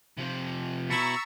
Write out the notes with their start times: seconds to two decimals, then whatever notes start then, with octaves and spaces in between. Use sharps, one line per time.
0.17 C3 F3
0.90 B2 E4 A#5 C#6 E6 A6 B6 C#7